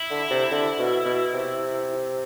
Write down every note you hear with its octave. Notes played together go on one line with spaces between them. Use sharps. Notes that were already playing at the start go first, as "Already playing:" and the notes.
Already playing: E4
D3
C3
D3
B2
B2
C3